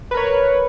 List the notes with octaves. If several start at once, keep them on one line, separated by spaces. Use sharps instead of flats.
A#4 B4 C#5